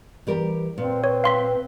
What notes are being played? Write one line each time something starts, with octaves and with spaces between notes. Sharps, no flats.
E3 G3 G4 A#4
A#2 C4 B4
B4 C#5
F5 C6 B6